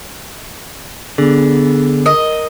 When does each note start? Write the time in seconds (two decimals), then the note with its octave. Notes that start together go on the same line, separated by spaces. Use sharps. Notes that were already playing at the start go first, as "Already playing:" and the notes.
1.18 D3 B3 G#4
2.06 A#4 D#5